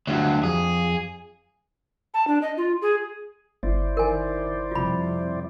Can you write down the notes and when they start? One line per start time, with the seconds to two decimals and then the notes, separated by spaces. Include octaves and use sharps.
0.07 D2 G2 F#3
0.43 F2 G#4
2.14 A5
2.27 D4
2.42 D#5
2.57 F4
2.82 G#4
3.63 G1 E4 C5 D5
3.97 D#3 A#4 G#5
4.71 F2 C3 G3 F4 B5